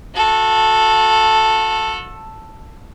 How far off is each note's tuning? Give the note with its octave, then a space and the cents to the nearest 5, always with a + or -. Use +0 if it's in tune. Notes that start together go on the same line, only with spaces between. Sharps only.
F#4 -35 A4 +0